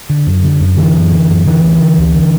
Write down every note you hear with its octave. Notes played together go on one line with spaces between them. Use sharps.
D3
F#2
D3
F#2
D3 E3
F#2
D3
F#2
D3 E3
D2
D3
D2
D3